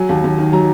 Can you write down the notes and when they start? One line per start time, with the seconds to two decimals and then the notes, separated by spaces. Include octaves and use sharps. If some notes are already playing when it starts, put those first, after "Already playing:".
Already playing: F#3 G#5
0.09 D#2
0.24 D#2
0.38 D#3
0.53 F#3 A#5